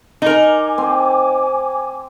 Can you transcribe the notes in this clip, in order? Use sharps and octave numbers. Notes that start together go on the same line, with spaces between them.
D#4 A#4 G#5 D6
C4